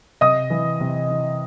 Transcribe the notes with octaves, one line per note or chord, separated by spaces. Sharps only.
C3 D#5 D#6
E3
C3
E3